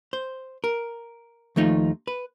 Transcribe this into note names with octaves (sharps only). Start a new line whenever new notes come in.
C5
A#4
D#2 F3 A3 D#4 F4
B4